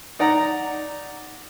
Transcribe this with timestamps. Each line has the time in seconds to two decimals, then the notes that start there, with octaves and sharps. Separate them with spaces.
0.19 D#4 D5 F#5 A#5